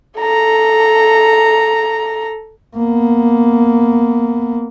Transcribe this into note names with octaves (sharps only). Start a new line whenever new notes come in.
A4 A#5
A#3 B3